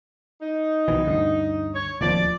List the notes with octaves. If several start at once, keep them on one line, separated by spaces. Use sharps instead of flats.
D#4
B1 B2 E3
D2 G2 D3
C#5
D1 D#2 F3 D5